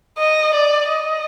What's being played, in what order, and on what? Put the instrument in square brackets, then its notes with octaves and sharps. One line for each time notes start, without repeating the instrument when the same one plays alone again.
[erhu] D#5
D5
D#5